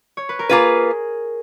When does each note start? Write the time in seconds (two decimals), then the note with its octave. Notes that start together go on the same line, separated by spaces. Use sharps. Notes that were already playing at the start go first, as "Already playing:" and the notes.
0.17 C#5
0.29 B4
0.39 A#4
0.49 A#3 F4 G#4 B4